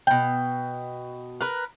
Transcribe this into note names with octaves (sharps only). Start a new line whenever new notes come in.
B2 G5
A#4 B4